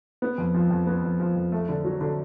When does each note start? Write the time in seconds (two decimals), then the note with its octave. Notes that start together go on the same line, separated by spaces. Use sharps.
0.22 B3
0.38 F2
0.54 F3
0.71 F2
0.87 B3
1.04 F2
1.20 F3
1.36 F2
1.52 A3
1.69 D3
1.84 F#3
2.01 D3